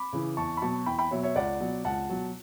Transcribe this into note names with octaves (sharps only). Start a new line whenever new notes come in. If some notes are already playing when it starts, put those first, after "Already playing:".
Already playing: B5 D6
C#3 E3
E2 A5 C#6
B5
B2 F#3 A5 C#6
E2 G5 B5
G5 B5
B2 F#3 C#5 E5
C#5 E5
C#2 D5 F#5
B2 F#3
C#2 F#5 A5
B2 F#3